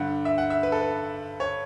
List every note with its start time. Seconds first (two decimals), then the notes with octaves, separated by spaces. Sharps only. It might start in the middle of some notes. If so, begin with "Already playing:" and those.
Already playing: G2 D3 F#5
0.25 E5
0.38 F#5
0.50 E5
0.63 B4
0.72 A4
0.81 B4
1.40 C#5